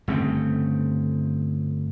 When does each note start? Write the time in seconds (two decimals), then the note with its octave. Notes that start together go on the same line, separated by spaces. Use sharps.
0.08 G1 C#3 A3 C4